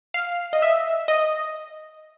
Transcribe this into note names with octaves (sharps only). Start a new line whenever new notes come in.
F5
D#5
E5
D#5